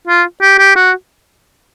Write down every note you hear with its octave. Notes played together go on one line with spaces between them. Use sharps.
F4
G4
G4
F#4